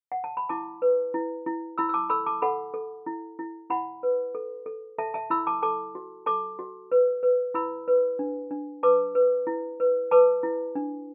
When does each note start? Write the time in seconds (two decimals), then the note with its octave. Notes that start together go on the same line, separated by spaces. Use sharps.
0.12 F#5
0.24 A5
0.37 B5
0.49 E4 A5 D6
0.82 B4
1.14 E4
1.46 E4
1.78 E4 B5 E6
1.89 E6
1.94 A5 D6
2.10 A4 B5 E6
2.26 A5 D6
2.42 A4 F#5 B5
2.74 A4
3.06 E4
3.39 E4
3.70 E4 F#5 B5
4.03 B4
4.35 A4
4.66 A4
4.98 A4 E5 A5
5.14 E5 A5
5.30 E4 B5 E6
5.47 A5 D6
5.63 A4 A5 D6
5.95 F#4
6.26 A4 A5 D6
6.59 F#4
6.92 B4
7.23 B4
7.54 E4 B5 E6
7.88 B4
8.19 D4
8.51 D4
8.83 B4 A5 D6
9.15 B4
9.47 E4
9.80 B4
10.11 B4 A5 D6
10.43 E4
10.75 D4